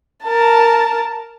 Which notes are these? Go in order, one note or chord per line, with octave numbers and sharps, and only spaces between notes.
A#4 A5